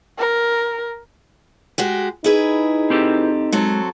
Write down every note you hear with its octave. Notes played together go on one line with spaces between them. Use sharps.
A#4
G#3 F#4 G4
D#4 E4 G#4 B4
C4 G4 A4
F#3 G#3 C4 A4